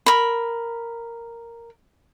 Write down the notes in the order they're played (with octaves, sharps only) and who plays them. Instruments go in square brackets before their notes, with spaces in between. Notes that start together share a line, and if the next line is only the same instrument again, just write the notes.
[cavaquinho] A#4 B5